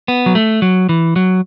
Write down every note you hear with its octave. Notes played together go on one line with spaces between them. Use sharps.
B3
F#3
A3
F#3
E3
F#3